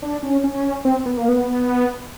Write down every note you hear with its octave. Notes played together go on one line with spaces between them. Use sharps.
D4
C#4
C#4
C4
B3
A#3
B3